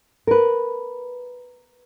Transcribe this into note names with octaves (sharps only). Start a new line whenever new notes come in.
A#4 B4